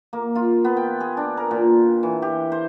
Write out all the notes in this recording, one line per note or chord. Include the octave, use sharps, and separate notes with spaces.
A#3
F4
B3
G5
G#4
D4
A#4
A#2
E3
G4
C5